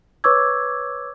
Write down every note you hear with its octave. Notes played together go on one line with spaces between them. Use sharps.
B4 C#5 C#6 D6 E6 G#6